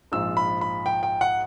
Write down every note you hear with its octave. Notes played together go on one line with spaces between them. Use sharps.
A#1 G#2 F3 E6
B5
B5
G5
G5
F#5